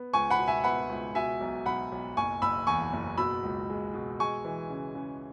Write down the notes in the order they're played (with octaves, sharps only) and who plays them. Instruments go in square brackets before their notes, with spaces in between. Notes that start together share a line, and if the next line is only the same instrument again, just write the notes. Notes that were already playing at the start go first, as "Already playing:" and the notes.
Already playing: [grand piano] B3
C#2 G#5 C#6
F#5 B5
B2
E5 G#5
B3 F#5 B5
C#2
B2 E5 G#5
B1
B1 F#5 B5
B1
F#1 G#5 C#6
F#1 B5 E6
E2 G#5 C#6
F#1
B2 B5 E6
C#2
G#3
B2
G#3 G#5 C#6
E3
C#3
C#3